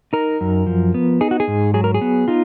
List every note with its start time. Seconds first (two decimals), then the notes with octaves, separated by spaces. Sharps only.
0.13 D#4 A#4
0.41 F#2
0.67 F3
0.94 B3
1.21 D#4 G#4
1.31 F#4
1.40 G#4
1.48 G#2
1.74 F#3 G#4
1.84 A#4
1.94 G#4
2.01 B3
2.28 D#4 F4